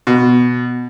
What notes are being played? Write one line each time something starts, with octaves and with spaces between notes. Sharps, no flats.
B2